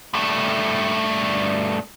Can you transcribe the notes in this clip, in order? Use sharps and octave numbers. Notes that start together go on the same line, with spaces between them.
G2 A3